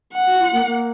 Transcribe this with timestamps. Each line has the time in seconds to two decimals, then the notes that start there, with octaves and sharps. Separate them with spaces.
0.14 F#5
0.26 F#4
0.39 F4
0.53 A#3
0.66 A#3